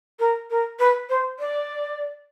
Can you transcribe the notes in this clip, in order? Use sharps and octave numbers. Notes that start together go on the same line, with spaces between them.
A#4
A#4
B4
C5
D5